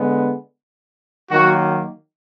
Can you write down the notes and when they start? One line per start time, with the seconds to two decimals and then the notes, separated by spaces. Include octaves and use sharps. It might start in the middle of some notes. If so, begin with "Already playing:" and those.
Already playing: D3 G#3 B3
1.30 D#3 F#3 A#3 F#4